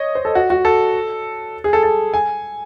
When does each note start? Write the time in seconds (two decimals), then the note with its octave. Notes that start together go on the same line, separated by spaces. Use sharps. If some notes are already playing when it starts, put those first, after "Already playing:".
Already playing: C#5 D#5
0.15 C5
0.25 A4
0.35 F#4
0.50 F#4
0.65 A4
1.64 G#4
1.73 A4
1.83 A4
2.14 G#5